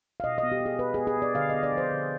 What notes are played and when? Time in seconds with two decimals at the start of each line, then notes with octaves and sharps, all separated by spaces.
0.20 F5
0.24 B2 D#5
0.38 D#5
0.43 B3
0.52 G4
0.60 B3
0.66 G#4
0.79 B3 B4
0.94 G#4
0.98 B3
1.07 G#4
1.17 B3
1.22 D5
1.35 D3 F5
1.50 B3 D#5
1.63 D5
1.72 F3
1.78 C5
1.92 D3